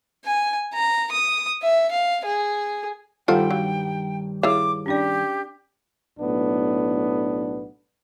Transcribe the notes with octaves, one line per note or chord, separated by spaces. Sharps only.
G#5
A#5
D#6
E5
F5
G#4
G2 D#3 G3 F4 A4 C5 F#5 G5
F#3 F5
E4 G4 G#4 C#5 F5 D6
C#4 D4 G4 D5
B1 A2 B3 D4